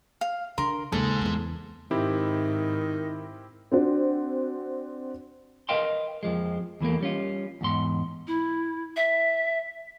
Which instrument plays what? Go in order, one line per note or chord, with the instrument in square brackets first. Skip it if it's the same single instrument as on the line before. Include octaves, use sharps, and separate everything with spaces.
[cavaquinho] F5
[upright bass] D3 [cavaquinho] A#4 C6
[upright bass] D#2 C#3 [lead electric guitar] G#2 G#3 [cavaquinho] A4
[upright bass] E2 B3
[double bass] G#2 [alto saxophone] D#3 [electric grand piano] C4 E4 G4
[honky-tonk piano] C4 D4 F#4
[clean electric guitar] A#4 B4 D#5 F5 G5 C6
F2 F3 G#3
E2 E3 A3 A#3
G3 C#4 F4
E2 G#2 C6
[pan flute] E4
E5